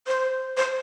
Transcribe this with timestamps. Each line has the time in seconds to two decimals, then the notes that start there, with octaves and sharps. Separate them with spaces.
0.08 C5
0.57 C5